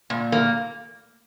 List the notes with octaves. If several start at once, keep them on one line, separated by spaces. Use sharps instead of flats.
A#2
A#3